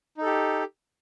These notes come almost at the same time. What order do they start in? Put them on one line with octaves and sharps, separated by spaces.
D#4 A4 G4